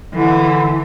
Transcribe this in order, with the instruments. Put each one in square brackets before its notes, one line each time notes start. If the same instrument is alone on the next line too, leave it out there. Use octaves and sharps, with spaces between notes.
[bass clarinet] D3 [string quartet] E3